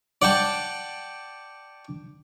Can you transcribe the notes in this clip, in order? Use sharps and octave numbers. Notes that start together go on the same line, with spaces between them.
D5 F#5 G5 A5